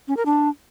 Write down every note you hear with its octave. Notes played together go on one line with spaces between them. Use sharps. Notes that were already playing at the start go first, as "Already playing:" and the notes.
C#4
A#4
D4